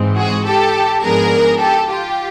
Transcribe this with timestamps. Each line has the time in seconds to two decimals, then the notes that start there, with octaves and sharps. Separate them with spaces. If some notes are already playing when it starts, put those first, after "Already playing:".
Already playing: G#2 E3 G#3 C4
0.16 F#4 G#4
0.45 G4 A4
1.03 G#2 F3 G#3 B3 D4 G#4 A#4
1.60 G4 A4
1.89 F4 G4